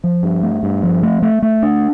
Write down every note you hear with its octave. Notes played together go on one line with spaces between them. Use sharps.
F3
G2
A3
G2
F3
A3
A3
A3
D4